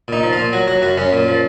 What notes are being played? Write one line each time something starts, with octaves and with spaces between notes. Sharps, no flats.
A#2 D#4
F3
A#2 F4
F#3 F#4
F#3 F#4
F#2 F#4
F#2 C#4
A#2
F3